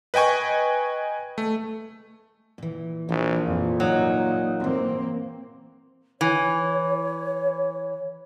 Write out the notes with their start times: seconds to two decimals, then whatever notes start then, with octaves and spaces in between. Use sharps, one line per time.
0.14 B4 D#5 G5 G#5 C#6
1.38 A3
2.58 A#2 E3
3.08 A#1 E3 G4
3.46 F2 A#2
3.80 F#3 D#4
4.60 G#2 E3 A#3 C4
6.21 E3 C#5